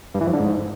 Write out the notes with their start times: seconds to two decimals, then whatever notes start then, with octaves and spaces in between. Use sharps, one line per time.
0.14 G2
0.21 E3
0.27 F2
0.33 D3
0.40 G#2